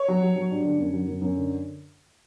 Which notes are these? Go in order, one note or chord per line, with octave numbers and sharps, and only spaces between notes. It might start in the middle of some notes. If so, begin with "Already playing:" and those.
Already playing: C#5
F#3
F#3
F#3
G2
D3
F#2
F#3
F#2
F#2
D3